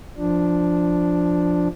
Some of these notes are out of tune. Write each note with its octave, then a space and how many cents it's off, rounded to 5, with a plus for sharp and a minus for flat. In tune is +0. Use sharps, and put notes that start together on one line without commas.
F3 -5 D4 +0